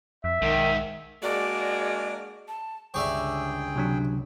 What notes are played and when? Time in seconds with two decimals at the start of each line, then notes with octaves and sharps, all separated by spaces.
0.24 F2 E5
0.42 B1 G#2 D#3
1.23 G#3 A#3 D4 F#4 D5
2.48 A5
2.94 G1 C#2 G#4 C#5 D5 E5 G5
3.76 C3 F#3 D4